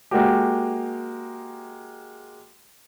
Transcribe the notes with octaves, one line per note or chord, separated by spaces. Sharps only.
G#3 A#3 F#4 G4